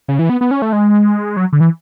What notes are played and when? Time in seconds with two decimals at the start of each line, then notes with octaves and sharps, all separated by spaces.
0.08 C#3
0.19 E3
0.30 B3
0.41 B3
0.51 C#4
0.62 A3
0.73 G#3
1.37 F#3
1.53 D3
1.60 E3